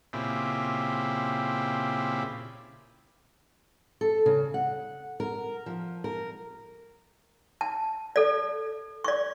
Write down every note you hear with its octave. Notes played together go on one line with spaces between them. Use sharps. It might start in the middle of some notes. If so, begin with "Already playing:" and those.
A#2 C#3 C4 E4 G4
A4
C#3
F#5
A#4
F3
A#4
A5
A4 D5
D5 C#6